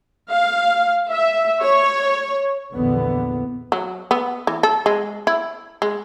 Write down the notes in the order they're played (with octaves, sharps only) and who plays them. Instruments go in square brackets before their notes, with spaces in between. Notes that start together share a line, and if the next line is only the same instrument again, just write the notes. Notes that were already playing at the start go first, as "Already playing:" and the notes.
[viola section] F5
E5
C#5
[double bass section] A#1 E2 D3 B3
[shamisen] F#3
B3
E3
A4
G#3
E4
G#3